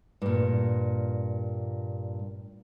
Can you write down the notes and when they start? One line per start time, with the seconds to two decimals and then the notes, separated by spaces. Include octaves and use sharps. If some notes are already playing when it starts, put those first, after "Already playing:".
0.22 G2 A#2